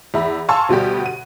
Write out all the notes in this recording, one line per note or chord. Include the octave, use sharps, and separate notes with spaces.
E2 E5 B5
F5 G#5 A5 C6 C#6 E6
D2 B2 G3 G4
F#4 D#7